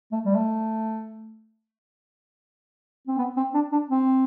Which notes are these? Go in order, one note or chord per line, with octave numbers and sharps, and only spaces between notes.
A3
G3
A3
C4
B3
C4
D4
D4
C4